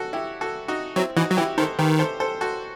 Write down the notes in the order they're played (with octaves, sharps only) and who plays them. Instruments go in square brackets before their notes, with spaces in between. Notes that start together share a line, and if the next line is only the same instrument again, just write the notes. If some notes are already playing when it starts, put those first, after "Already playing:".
Already playing: [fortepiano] F#4 A4
E4 G4
F#4 A4
D#4 F#4
[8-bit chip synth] F#3 [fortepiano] C4 E4
[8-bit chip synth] E3 [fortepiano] D#4 F#4
[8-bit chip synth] F#3 [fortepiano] F#4
[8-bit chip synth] E3 [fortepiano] E4 G4
[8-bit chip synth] D#3 [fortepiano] A4 C5
[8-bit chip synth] D#3 [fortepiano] G4 B4
[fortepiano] A4 C5
A4 C5
F#4 A4